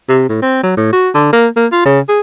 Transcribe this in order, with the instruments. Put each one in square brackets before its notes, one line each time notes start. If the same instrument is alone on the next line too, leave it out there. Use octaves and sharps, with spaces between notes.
[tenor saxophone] C3
A2
C4
F#3
A2
F#4
D3
A#3
A#3
F4
C#3
G#4